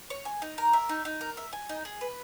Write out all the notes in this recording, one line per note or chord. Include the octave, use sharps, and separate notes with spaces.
C#5
G#5
D#4
A#4
E5
D#4
D#4
A#4
E5
G#5
D#4
G#4
B4